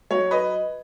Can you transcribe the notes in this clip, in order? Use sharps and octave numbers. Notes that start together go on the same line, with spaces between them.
F#3 C#5
B4 D#5